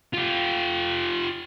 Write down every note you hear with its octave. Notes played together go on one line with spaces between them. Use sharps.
F4 G4